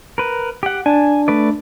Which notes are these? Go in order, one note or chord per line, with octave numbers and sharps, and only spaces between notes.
A#4 B4
G4 F#5
D4 G#5 A5
A3 B4 D5